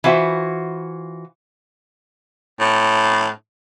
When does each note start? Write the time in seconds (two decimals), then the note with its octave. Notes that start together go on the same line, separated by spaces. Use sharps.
0.04 E3 F4 F#4 C5 E5
2.60 A2